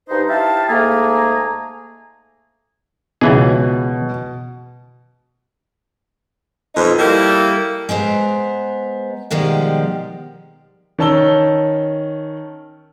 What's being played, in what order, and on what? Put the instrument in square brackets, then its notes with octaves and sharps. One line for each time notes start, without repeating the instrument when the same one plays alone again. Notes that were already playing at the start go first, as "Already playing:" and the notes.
[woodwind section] G2 D#4 C5
E4 G4 E5 F5 A5
G#2 A3 A#3 G#4 G#5 A#5
[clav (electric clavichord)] C#2 E3 G#4 [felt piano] B2
[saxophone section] F2 B2 D#4
G3 A#3 E4 A4
[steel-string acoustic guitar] G#3 B3 C5 A#5
B2 D#3 F3 G3 G#3
[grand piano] D#3 C#4 A5 E6 G7